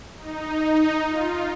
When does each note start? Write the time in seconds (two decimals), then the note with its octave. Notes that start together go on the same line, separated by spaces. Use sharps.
0.17 D#4
1.08 F4